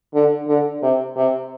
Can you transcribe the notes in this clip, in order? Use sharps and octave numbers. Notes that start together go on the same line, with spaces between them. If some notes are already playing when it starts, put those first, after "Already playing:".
D3
D3
C3
C3